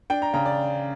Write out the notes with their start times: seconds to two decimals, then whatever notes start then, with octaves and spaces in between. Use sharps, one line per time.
0.10 D4 G5
0.22 A#5
0.34 C#3 A#5
0.46 D5